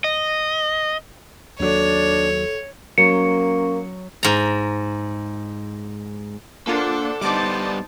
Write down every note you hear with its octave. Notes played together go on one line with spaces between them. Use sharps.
D#5
D#2 F#3 D4 A4 C#5
F#3 A#3 C#4 C#6 C#7
G#2 A#5
A#3 D4 F4 A4 C5 F#5
G3 B3 D#4 C5 D5 A5 D6